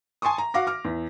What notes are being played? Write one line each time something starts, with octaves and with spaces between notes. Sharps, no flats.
G#5 A5 C6 C#6 D#6
A#5
F#4 F5 D6 A#6
D6 F6
E2